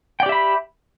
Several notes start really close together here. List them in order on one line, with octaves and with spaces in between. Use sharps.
G5 D5 G4 E5 B5